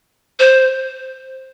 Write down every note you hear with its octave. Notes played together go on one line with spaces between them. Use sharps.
C5